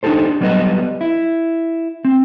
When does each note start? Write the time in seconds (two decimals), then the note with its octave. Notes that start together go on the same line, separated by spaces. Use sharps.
0.03 D4 D#4 F4 G4 A4 C5
0.41 F#3 G3 B3 B4 D#5
1.01 E4
2.05 C4